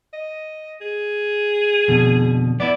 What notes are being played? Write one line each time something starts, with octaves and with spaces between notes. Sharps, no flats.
D#5
G#4
F2 B2 D3
B3 E4 D5